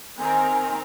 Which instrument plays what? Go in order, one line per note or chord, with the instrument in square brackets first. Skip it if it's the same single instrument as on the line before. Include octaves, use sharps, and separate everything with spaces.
[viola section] D#3 C4 A#4 [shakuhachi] G#5